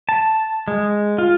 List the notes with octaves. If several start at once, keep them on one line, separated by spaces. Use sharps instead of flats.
A5
G#3
F4